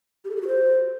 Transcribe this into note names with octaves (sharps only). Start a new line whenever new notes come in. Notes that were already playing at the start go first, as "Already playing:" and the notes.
G4
A4
G4
F#4
C5